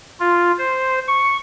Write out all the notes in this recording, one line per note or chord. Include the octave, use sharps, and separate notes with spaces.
F4
C5
C#6